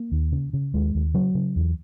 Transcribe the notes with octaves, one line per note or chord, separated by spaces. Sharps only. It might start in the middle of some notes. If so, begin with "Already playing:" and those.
Already playing: A#3
D#2
C#3
C#3
D#2 G#3
D#2
C#3 F#3
C#3
E2